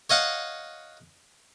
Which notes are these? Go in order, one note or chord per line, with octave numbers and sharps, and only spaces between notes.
C#5 D#5 F5 F#5